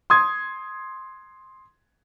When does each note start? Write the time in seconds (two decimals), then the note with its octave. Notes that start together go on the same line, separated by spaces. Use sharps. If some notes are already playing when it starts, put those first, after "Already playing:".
0.10 C6 D#6 G#6